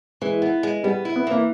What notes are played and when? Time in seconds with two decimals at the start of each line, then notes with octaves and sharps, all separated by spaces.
0.21 E3 G#3
0.42 B3
0.63 G#3
0.84 G3 B3
1.05 E4
1.16 B3
1.27 E3 A#3